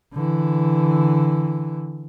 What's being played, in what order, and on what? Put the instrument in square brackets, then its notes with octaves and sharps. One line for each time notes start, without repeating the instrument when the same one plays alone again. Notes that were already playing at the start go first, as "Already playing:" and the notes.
[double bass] D3 E3